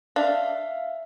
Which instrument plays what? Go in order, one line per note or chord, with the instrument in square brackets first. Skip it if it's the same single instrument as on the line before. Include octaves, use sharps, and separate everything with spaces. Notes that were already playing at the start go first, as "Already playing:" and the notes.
[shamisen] D4 [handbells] E5 F5